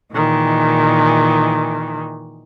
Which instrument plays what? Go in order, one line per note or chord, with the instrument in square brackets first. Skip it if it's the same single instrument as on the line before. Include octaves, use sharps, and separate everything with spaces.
[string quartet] A#2 D#3 E3 G#3